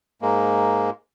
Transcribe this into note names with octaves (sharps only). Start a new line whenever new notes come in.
G#2 G#3 A#3